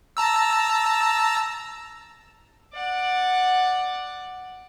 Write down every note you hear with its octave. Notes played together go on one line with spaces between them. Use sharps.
A5 A#5 E6
D5 F#5